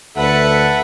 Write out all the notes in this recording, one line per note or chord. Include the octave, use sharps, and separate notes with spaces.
D2 A4 B4 E5 F#5